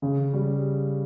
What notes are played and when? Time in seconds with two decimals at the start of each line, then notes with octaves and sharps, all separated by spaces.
0.02 C#3
0.34 G3